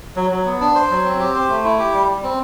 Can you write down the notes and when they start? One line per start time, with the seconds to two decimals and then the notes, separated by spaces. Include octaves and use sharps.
0.16 F#3
0.31 F#3
0.46 B3
0.60 D4
0.75 C5
0.91 F#3
1.04 C4
1.20 G4
1.35 C5
1.49 A3
1.64 E4
1.79 G4
1.93 G3
2.08 G3
2.23 C4